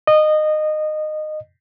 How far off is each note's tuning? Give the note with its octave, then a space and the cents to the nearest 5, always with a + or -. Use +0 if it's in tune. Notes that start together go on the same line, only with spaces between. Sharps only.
D#5 -20